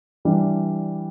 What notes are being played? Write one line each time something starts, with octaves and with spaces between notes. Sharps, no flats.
E3 G3 D4 G4